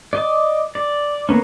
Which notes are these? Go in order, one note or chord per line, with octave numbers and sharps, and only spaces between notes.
D5 D#5 D6
D5
A#3 B3 C#4